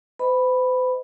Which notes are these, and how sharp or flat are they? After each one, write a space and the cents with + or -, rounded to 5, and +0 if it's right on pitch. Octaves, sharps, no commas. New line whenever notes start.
C5 -45 D#5 +0 B5 +0